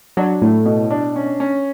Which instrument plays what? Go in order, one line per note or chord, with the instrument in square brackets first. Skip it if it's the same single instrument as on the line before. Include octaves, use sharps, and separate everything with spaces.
[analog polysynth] F#3 [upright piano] D4
[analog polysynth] A2 [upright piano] A3
[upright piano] B2
D4
C#4
C#4